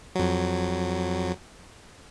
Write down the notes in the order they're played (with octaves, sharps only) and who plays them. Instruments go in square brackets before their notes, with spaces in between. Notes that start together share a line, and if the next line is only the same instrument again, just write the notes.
[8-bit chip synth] F2 F#3